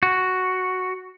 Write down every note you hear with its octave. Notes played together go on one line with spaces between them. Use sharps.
F#4